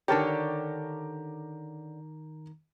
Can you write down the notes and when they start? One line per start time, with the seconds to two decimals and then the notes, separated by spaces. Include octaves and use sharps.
0.08 D3 D#3 G4 A#4 C#5 A5 A#5